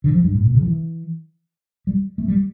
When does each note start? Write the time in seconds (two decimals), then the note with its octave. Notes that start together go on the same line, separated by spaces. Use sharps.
0.04 D3
0.14 F3
0.24 G2
0.35 A2
0.45 A#2
0.55 C#3
0.61 F3
0.66 E3
1.87 G3
2.18 A3
2.28 G3